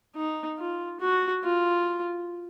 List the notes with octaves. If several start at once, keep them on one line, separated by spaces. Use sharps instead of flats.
D#4
F4
F#4
F4